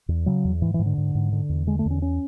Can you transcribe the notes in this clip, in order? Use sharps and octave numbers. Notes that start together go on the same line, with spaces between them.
E2
C#3 F#3
E2
G#2 E3
E3
G#2
D3
G#2
G#2
D3
E2
D3 G#3
A3
E2 C#4
C#4